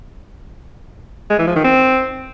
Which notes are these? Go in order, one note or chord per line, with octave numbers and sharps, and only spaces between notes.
G#3
E3
F3
D#3
C4